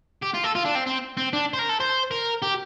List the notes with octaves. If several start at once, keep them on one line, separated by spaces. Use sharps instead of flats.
G4
F4
A4
F4
D4
C4
C4
C4
D4
C5
A#4
A4
C5
A#4
G4